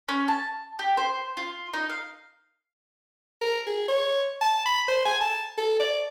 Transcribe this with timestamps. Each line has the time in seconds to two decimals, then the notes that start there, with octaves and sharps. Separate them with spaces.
0.09 C#4
0.28 A5
0.79 G4
0.97 C5
1.37 F4
1.73 D#4
1.90 F5
3.41 A#4
3.67 G#4
3.88 C#5
4.41 A5
4.66 B5
4.88 C5
5.05 G#5
5.21 A5
5.58 A4
5.80 D5